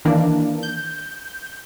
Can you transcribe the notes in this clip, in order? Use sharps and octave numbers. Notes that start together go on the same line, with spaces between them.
D#3 E3 A#3 D4
G6